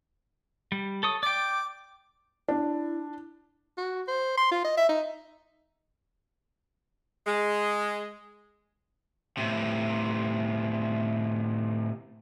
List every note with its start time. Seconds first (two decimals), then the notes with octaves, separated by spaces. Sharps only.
0.72 G3
1.03 A4 C#5 D#6
1.23 D5 G5 D6
2.48 D4 E4
3.77 F#4
4.08 C5
4.37 C6
4.51 F4
4.64 D#5
4.77 E5
4.89 D#4
7.27 G#3
9.37 A2 C3